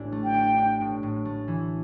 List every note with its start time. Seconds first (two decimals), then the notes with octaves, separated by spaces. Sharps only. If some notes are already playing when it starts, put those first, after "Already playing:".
Already playing: A1 D4
0.12 A3
0.24 G5
0.34 D4
0.58 D4
0.81 A2
1.03 A2
1.25 A3
1.48 E3